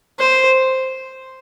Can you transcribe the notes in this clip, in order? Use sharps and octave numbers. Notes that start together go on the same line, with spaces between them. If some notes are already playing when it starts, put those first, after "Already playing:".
C5